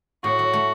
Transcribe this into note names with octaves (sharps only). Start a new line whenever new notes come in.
A2 F#4
F#3
A3